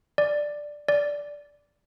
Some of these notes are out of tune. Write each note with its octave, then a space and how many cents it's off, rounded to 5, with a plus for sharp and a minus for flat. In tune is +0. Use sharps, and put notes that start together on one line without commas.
D5 +5
D5 -10